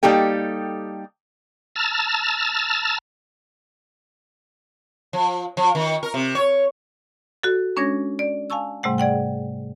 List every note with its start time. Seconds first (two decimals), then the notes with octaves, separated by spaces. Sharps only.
0.03 G3 A#3 D#4 G4 A4 G5
1.76 A5 A#5 E6 F6 A6
5.13 F3
5.57 F3
5.75 D#3
6.03 A#4
6.14 C3
6.35 C#5
7.43 F#4 A4
7.76 G#3 C#4 D4 C#5 G#6 A#6
8.19 D5
8.50 F5 G#5 A5 C#6 E6
8.83 G#2 C3 G3 A3 F#5
8.98 G#4 D5 F#5 G5